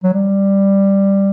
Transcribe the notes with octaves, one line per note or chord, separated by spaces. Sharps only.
F#3
G3